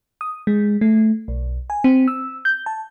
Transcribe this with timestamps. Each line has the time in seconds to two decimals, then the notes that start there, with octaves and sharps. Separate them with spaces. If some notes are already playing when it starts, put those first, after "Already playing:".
0.21 D#6
0.47 G#3
0.81 A3
1.28 B1
1.70 G#5
1.84 C4
2.08 E6
2.45 G6
2.66 A5